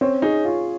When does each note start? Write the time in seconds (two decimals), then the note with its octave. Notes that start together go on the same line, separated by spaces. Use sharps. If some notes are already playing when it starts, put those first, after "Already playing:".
0.01 C4 C#4
0.22 D#4 G#4
0.45 F4